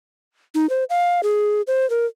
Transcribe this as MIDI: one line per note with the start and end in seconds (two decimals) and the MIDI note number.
0.55 0.69 63
0.70 0.84 72
0.90 1.21 77
1.23 1.62 68
1.67 1.88 72
1.90 2.06 70